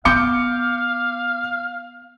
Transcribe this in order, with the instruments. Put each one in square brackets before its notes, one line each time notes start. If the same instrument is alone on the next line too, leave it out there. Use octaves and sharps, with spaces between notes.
[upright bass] B3 [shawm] F5 [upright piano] D6 G6 C#7